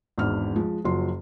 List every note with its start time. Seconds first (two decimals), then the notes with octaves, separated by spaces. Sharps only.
0.18 G#1 E2 D4 D#4 F6
0.55 F3 G#3
0.84 F#1 F3 F#3 C6